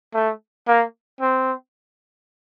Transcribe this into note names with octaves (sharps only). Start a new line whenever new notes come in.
A3
A#3
C4